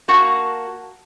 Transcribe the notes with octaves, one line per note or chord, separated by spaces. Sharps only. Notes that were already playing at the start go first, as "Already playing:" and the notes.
A#3 F#4 F#5 A5